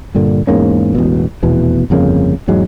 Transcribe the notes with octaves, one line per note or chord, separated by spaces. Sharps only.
G2 A#2 D3
E2 G#2 A#3 C#4
E1 A1 B2
F1 E2 B2 E3
G1 F2 C#3 A#3
E2 G#2 F#3 G#3